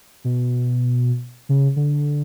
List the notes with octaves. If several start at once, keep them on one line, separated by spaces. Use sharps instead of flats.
B2
C#3
D3